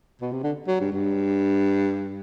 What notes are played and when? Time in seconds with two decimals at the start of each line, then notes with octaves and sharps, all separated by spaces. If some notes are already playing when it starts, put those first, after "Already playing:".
0.21 B2
0.32 C3
0.43 D3
0.67 F#3
0.80 G2
0.92 G2